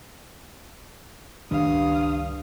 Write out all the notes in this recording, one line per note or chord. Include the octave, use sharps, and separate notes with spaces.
C#2 G2 D#3 C#4 F5 D#6